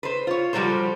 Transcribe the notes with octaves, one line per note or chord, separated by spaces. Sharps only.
B4 C5
F4 C#5
F3 G3 A3 F#4 A4 C5